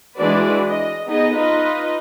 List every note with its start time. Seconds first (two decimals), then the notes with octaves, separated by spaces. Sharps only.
0.18 E3 G#3 D4 F#4 B4 D5
0.67 D#5
1.06 B3 D#4 G#4 D#5
1.36 D#4 F4 B4 D#5